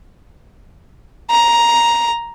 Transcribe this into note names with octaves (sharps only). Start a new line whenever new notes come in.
A#5